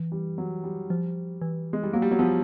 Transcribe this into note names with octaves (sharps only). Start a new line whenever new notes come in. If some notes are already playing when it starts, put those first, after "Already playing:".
Already playing: E3
G3
F#3
G3
F3
E3
G#3
G3
F#3 A#3
G3
F#3
F3 B3